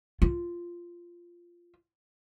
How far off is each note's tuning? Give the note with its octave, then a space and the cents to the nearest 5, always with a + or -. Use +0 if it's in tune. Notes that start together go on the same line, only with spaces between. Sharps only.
F4 -10